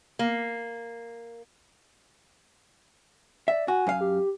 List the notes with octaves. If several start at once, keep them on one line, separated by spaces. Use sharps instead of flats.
A#3
D5 E5
F#4 G#5
F#2 F5
G4